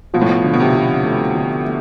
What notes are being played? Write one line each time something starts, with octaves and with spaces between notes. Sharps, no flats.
B2 F3
A2
B2
D3
B2
C3
F3
A3
D3
A3